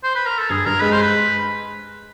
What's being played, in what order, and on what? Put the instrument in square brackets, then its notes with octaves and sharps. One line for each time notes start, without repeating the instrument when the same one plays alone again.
[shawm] C5
B4
A#4
A4
[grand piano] G2 [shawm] G#4
[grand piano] G2 [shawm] A#4
[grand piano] G#3 [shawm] B4
[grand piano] G#3 [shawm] C5
[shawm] B4